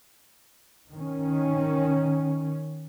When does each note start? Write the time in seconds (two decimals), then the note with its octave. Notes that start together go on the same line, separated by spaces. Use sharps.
0.92 D#3 C#4